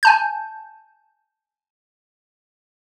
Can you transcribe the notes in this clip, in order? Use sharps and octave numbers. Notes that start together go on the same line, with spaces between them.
G#5 A5 G6